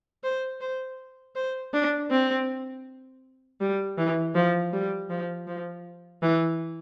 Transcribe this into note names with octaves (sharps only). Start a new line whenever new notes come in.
C5
C5
C5
D4
C4
G3
E3
F3
G3
F3
F3
E3